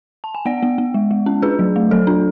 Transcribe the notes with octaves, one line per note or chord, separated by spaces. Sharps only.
A5
G#5
B3 D5 F#5
B3
B3
G#3
G#3
C#4
D4 G#4 B4
F#3
A3
F#3 A4
D4